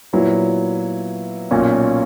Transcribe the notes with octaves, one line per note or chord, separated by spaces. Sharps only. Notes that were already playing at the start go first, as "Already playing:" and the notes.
A#2 F#3 B3 E4
B1 A#2 A#3 C#4